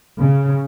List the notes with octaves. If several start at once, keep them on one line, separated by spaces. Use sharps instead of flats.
C#3